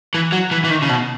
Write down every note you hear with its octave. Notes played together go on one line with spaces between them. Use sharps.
E3
F#3
E3
E3
D#3
C#3
B2